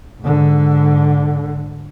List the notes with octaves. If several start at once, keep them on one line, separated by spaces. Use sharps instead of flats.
G#2 D3